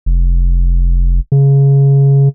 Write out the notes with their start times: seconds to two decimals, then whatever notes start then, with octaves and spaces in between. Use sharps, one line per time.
0.06 F1
1.32 C#3